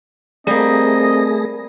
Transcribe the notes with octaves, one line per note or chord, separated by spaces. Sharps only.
G3 A3 A#3 C4 G#4 D#5 A#6